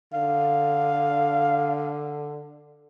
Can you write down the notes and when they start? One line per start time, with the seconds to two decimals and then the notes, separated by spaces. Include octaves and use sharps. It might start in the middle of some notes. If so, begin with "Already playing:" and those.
0.13 D3 F5